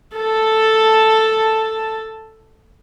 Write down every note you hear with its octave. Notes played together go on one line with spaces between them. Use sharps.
A4 A5